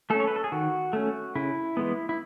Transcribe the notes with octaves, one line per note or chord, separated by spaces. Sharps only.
A3 C#4 A4
C#5
B4
A4
G#4
D#3 F#4
A3 C#4
C#3 E4
E3 G#3 B3
E4